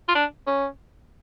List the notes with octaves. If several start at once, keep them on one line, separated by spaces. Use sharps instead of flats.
F4
D4
C#4